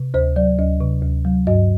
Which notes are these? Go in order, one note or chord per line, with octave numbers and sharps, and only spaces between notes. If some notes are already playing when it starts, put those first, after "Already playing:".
Already playing: C3
D2 C5
F#3 D5
D2 D#5
C3
D2
F#3
G2 D#5